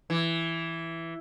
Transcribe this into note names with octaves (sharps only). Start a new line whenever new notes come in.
E3